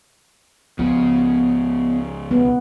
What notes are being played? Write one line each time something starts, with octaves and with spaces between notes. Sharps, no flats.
C#2 C#3 F3 B3
B3